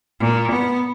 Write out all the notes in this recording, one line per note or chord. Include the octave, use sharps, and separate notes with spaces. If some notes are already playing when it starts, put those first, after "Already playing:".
A#2
B3